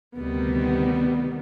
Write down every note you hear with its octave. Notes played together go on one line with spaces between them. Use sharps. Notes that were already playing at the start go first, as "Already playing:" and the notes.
D2 C3 D#3 G3 B3